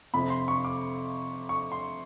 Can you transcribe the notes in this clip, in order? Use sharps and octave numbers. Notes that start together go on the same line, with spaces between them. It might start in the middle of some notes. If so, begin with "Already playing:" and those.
F2 C3 F3 B5
C6
C#6
D6
C#6
C6